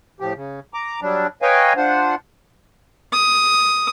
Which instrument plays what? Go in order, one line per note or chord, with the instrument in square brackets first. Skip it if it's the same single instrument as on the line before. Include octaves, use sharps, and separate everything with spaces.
[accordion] A2 F3 G4
C#3
A#5 D6
F#3 G3 D4
B4 C#5 D#5 F5 G5 G#5
D4 F4 C5 F#5
[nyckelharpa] D#6